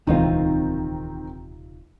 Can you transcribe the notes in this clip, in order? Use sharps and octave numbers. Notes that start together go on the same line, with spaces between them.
D#1 C#2 C3 D#3 E3 C4 D#4 F4